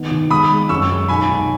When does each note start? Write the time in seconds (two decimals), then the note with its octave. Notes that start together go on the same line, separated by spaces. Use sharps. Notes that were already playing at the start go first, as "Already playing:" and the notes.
Already playing: D#3 B3
0.11 D#3
0.31 G#3 B5 D#6
0.51 G#3
0.69 F#2 C#6 E6
0.89 G#3
1.08 B1 G#5 B5
1.28 B1